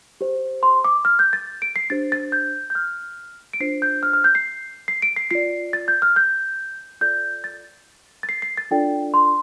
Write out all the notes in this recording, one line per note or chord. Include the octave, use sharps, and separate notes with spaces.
G4 C5
C6
D6
F6
G6
A6
D7
C7
D4 G4 C5 A6
A6
G6
G6
F6
D7
D4 F4 C5 C7
G6
F6
F6
G6
C7
C7
D7
C7
F4 D5 C7
A6
G6
F6
G6
F4 A4 D5 G6
A6
A6
C7
C7
A6
D4 F4 A4 D5 G5
C6